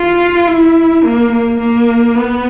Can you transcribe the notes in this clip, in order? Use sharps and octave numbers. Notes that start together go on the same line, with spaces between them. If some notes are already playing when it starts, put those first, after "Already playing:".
Already playing: F4
E4
A#3
A#3
A#3
B3